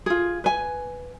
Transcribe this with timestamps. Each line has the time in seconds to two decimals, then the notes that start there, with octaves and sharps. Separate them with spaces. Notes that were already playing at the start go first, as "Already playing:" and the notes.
0.06 F4 G#4
0.44 B4 G#5